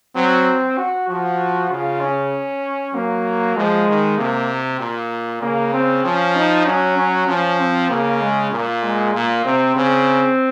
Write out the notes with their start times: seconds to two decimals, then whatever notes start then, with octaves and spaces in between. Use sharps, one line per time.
0.16 F#3 C4
0.77 F#4
1.09 F3 F#4
1.70 C#3 F4
2.01 C#4
2.94 F#3 A#3
3.56 F3 G#3
3.88 D#3
4.18 C3 A#3
4.80 A#2
5.42 C#3 A#3
5.73 C4
6.05 F3 C#4
6.35 D#4
6.66 F#3 C#4
6.98 C#4
7.28 F3 C#4
7.59 C4
7.90 C#3 A#3
8.22 G#3
8.52 A#2 A#3
8.83 G#3
9.14 A#2 A#3
9.45 C3 C4
9.76 C#3 C4